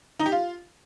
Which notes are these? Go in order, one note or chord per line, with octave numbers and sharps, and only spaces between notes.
D#4
G4
F4